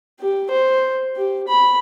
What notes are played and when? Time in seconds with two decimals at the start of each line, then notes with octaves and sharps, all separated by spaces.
0.20 G4
0.50 C5
1.16 G4
1.48 B5